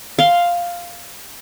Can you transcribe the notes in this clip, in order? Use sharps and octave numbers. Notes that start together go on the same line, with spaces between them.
F5 C6